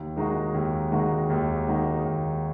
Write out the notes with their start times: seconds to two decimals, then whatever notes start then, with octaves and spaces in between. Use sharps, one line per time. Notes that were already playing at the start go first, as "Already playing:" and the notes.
Already playing: D#2
0.16 D#3 G#3 D#4 F#4
0.54 D#2
0.92 D#3 G#3 D#4 F#4
1.30 D#2
1.67 D#3 G#3 D#4 F#4
2.05 D#2